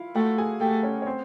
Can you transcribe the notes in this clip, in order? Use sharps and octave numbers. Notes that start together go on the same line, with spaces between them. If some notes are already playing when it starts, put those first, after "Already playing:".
Already playing: E4 F4 F5
A3 F#4 F#5
G#4 G#5
A3 G4 G5
C#4 C#5
C#5
C4 C5